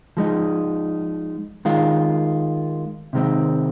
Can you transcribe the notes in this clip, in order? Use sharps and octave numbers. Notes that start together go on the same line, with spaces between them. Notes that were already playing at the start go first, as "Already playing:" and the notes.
F3 G#3 D#4
D#3 G#3 F4
C3 D#3 G#3 C4